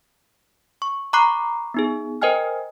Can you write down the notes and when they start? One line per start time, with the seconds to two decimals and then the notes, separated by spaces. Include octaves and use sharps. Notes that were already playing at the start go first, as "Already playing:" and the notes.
0.82 C#6
1.13 A#5 B5 C#6 D6 F#6 C7
1.74 B3 D#4 G#4
2.22 A#4 C5 D#5 G5 G#5 F6